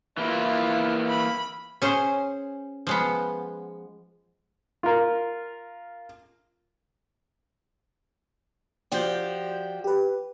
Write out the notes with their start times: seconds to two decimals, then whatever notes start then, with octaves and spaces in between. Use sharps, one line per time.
0.17 E3 A#3 E4 F4
1.08 B5
1.82 C#4 G#4 C5
2.87 F3 G#3 B3
4.83 F4 A#4
8.92 F3 F#4 G4 D5 G6
9.84 G4 B4